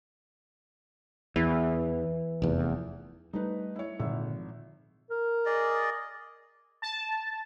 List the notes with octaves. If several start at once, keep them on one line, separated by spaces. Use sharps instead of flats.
E2 E3
F1 E2
G3 A3 D#4 B4
E4 C#5
G#1 A#2 D3 F3 E5
A#4
G#4 D5 D#5
A5